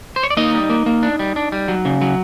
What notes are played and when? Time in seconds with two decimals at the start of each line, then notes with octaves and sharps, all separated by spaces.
0.16 C5
0.23 C#5
0.30 D5
0.37 A#3 D#4 D#5
0.54 G3
0.70 A#3
0.86 A#3
1.03 D4
1.19 G3
1.36 D4
1.52 G3
1.68 F#3
1.85 C#3
2.01 F#3